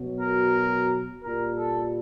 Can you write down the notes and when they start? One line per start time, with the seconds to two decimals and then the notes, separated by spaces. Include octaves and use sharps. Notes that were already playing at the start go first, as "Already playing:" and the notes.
Already playing: B2 F#3
0.21 A#4
1.22 A#2 G3 A#4
1.56 A4